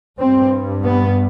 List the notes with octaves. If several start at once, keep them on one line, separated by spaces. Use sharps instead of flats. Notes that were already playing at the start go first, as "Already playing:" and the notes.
G2 C4
B3